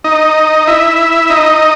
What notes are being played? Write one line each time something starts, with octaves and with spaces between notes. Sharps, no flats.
D#4 D#5
E4 E5
D#4 D#5